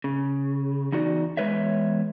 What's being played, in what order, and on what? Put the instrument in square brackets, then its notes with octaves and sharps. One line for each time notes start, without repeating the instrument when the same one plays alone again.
[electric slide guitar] C#3
E2 D#4 F#4 D5
E2 G#3 B4 C#5 E5